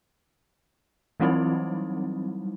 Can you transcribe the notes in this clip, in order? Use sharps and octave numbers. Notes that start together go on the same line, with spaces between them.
E3 F#3 G3 C4 D#4 E4